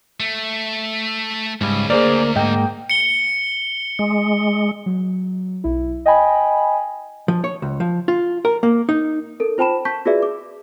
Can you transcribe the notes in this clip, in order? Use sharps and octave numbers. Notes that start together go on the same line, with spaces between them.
A3
C#2 G#2 C#3 G3
D2 A#3 G#4 C5 D5
G#2 A#3 D#5 G5
C#7 G7
G#3
F#3
B1 E4
D#5 G5 G#5 B5
F3
C#5
C#2
F3
F4
A#4
A#3
D#4
A4 A#4
F4 C5 G5 A5 B5 E7
A5 C#6 G6 B6
F4 F#4 G#4 B4 D5 E5
D6